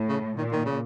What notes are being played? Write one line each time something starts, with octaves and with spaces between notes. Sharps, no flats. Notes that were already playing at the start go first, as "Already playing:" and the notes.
Already playing: A2
C#3
A#2 D#3
D#3
C#3